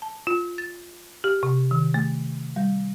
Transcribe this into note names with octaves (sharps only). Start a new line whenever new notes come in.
A5
F4
A6
G4
C3
D#3
A3
G3